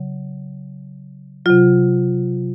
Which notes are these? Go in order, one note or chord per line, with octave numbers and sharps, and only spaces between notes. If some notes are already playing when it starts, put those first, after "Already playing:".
Already playing: C#3 F#3
C3 F#3 F4